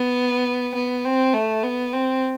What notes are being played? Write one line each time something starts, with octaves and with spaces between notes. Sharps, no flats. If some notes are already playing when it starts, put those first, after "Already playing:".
Already playing: B3
B3
C4
A3
B3
C4